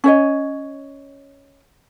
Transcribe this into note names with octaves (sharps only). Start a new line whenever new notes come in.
C#4 C#5 D#5